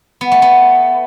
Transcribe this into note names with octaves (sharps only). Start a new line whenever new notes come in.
B3
A3
B3